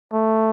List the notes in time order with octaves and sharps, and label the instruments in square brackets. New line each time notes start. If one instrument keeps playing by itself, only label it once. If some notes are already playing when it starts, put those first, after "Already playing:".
[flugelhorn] A3